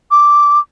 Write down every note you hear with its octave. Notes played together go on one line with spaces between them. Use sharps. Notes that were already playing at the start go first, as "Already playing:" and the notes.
D6